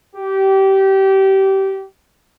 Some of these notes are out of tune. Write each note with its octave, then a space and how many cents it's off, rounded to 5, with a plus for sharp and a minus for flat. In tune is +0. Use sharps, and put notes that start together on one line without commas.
G4 -25